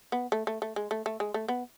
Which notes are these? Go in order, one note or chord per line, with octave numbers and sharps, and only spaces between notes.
B3
A3
A3
A3
G#3
A3
A3
G#3
A3
B3